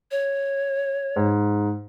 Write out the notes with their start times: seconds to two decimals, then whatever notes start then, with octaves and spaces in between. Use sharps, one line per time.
0.11 C#5
1.16 G#2